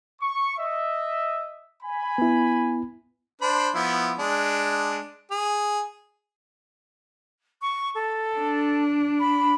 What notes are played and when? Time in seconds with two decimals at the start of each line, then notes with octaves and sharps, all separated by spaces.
0.22 C#6
0.58 D#5 E5
1.83 G#5 B5
2.18 B3 E4
3.41 D4 C5 B5
3.75 F3 B3 E4
4.19 G#3 D4
5.31 G#4
7.61 C#6
7.94 A4
8.38 D4
9.19 B5